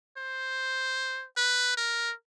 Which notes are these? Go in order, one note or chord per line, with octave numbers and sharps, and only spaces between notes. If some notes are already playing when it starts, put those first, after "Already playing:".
C5
B4
A#4